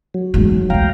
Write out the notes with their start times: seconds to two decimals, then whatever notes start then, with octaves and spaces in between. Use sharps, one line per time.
0.14 F#3
0.34 E2 G#2
0.70 E1 B1 F5 G5 A#5